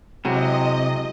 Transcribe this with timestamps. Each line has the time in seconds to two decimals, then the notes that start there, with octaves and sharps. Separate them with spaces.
0.25 C3 F#3 G#3 E4 D#5